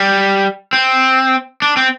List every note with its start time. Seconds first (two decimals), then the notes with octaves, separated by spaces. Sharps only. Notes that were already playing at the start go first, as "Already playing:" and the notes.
Already playing: G3
0.73 C4
1.62 D4
1.77 C4